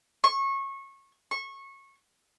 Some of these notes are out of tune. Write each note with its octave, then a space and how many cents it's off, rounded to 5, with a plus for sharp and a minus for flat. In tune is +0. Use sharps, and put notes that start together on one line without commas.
C#6 -25
C#6 -20